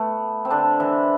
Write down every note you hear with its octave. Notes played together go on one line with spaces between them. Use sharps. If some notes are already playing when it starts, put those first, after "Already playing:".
Already playing: A3 B3
C4
D3 D4
E3 E4